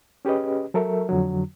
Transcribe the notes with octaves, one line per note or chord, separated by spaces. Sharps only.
C#4 G4 G#4 B4 D#5
F#3 A4 A#4 E5
F2 D3 F#3